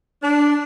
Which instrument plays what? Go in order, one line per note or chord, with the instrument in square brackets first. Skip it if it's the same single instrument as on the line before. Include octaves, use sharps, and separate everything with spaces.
[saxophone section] D4